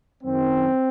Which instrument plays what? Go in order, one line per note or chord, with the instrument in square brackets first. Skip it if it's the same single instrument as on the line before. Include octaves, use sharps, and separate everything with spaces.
[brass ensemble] F#2 D#3 C4